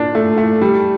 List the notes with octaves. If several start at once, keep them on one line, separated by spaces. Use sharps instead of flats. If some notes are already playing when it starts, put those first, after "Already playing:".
Already playing: A#2 D4
A3
A3
G3